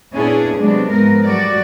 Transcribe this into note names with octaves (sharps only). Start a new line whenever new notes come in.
A#2 B3 C#4 D4 E4 G#4
C3 F#3 G#3 A3 B3 D4
G#2 F3 B3 A#4
F#3 G3 A3 F#4 D5